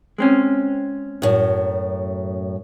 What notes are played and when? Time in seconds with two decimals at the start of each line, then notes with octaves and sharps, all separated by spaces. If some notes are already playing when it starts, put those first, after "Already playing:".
0.18 G#3 C4 C#4
1.22 F#2 A2